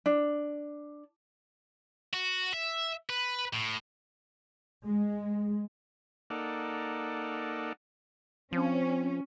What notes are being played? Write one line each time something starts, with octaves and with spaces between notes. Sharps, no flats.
D4
F#4
E5
B4
A2
G#3
A#3 D#4 A4 D5 F#5
F3 C4 C#4